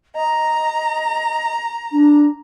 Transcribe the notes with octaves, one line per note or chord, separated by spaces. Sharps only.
D#5 A#5
D4